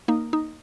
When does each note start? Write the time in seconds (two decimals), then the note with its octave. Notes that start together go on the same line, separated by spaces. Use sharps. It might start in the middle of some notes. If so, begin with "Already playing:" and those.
0.08 A#3 D#4
0.33 D#4